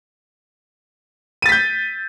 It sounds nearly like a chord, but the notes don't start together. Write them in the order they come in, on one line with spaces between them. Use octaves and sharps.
D#7 A6 B6 G6